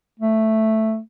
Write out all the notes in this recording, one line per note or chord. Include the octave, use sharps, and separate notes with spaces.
A3